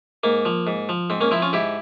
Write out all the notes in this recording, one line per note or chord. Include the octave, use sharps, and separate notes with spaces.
G#2 A#3
F3
G#2
F3
G#2 C4
A#3 C#4
F3 C4 E4
C#4 F4
G#2 E4 G4